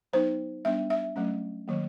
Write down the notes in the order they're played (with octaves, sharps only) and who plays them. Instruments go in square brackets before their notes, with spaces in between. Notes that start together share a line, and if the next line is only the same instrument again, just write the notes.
[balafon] F#3 B3 D#4 C5
G3 B3 D4 E5
E5
F#3 A3 C#4
D#3 F#3 A#3